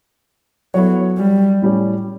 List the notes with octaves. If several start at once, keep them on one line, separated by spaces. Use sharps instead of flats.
F#3 B3 E4 A4 C#5
G3
A2 G3 C#4 G4